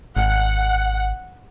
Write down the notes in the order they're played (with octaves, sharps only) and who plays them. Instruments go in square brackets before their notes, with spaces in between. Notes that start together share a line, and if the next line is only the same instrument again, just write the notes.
[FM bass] G#1 [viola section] F#5